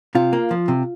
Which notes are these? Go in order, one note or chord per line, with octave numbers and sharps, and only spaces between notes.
C3 F4
A#3
F3
C3